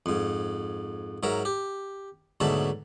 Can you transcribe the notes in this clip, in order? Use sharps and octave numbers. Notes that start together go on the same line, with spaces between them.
F2 G#2
G#2 F#3 A#4 E5
G4
D2 G#2 B2 F#3 E5 A5